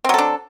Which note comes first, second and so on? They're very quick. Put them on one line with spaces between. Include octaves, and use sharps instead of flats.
C4 F#3 A4 D4